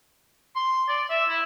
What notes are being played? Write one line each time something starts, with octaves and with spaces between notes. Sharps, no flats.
C6
D5
E5
E4